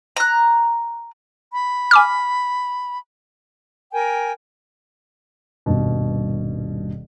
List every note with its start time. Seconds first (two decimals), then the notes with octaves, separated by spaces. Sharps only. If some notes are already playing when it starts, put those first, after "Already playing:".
0.16 A#5 F#6
1.52 B5
1.91 G#5 D6 F6
3.93 A#4 G5 G#5
5.66 D#1 G2 B2